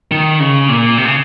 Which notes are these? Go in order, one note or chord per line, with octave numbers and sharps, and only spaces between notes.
D#3
C#3
A#2
C3
C#3